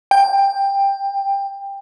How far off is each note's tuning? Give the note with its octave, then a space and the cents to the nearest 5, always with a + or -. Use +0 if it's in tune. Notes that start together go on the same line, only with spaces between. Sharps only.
G5 +15